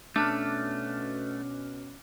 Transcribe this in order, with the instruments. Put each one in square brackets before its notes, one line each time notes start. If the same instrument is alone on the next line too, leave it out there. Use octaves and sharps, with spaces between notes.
[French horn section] B2 C#4 [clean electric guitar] A3 [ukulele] D4 [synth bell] D6 F6 F#6